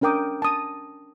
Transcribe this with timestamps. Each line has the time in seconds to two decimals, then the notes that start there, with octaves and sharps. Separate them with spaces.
0.01 C#4 D4 A#4 G5 D6 D#6
0.42 A5 D#6